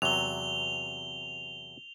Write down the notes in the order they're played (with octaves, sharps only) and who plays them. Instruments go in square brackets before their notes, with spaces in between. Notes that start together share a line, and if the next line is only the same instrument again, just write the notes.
[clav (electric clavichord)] E2 C3 F#3 [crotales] F7 G7